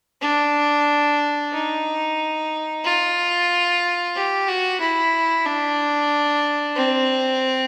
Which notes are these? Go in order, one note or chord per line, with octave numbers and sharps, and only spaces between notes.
D4
D#4
F4
G4
F#4
E4
D4
C4